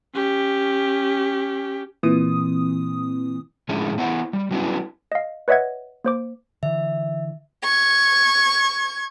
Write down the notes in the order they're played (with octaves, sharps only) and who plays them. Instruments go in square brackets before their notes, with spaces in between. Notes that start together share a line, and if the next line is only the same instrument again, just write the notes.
[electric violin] C#4 G4
[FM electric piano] A#2 E3 D#6 [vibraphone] C4
[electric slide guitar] A2 D3 F3 G#3 C#4 E4
B3 E4 C5 F#5
G3
F#3 G3 B3 C#4 D4 E4
[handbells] D#5 F5
B4 C#5 D#5 E5 F#5 G#6
A#3 C5 D6
[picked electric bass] D3 E3 [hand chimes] E5
[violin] C#6 G#6